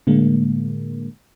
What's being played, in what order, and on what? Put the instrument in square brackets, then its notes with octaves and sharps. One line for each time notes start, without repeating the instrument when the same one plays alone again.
[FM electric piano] A2 D3 G#3 A#3